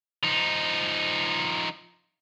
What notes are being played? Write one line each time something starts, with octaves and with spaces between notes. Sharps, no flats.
F3 D#4